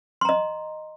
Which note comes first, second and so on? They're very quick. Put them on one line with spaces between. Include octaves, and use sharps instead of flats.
C6 A#5 D#5